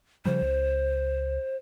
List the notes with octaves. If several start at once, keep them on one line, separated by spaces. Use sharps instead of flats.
C#3 F3 G3 C5
C#2